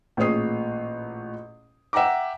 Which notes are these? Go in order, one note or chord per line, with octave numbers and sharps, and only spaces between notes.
A1 A#2 G#4 C#5 D#6 C7
E5 F#5 G5 A#5 D6